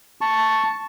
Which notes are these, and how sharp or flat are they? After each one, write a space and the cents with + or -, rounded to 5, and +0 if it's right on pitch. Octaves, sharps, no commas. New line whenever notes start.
A5 +0 C#6 +0